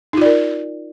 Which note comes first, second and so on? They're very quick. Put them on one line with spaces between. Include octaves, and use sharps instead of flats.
D#4 F4 D5 A#4